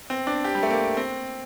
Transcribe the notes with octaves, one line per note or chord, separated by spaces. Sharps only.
C4
D4
G4
G3
A3
A#3
C4